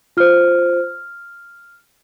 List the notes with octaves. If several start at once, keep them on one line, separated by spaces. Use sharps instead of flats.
F4 C5 F6